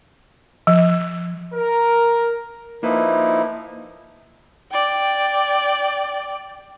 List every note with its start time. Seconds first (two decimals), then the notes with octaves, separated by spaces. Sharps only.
0.67 F3
1.54 A#4
2.83 F3 A#3 D#4 E4 B4
4.72 D5 G5